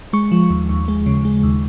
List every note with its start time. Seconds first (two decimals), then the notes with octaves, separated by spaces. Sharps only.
0.13 G#3 C#6
0.32 F3
0.50 D#2
0.69 D#2
0.88 G#3
1.06 C#3
1.25 G#3
1.44 D#2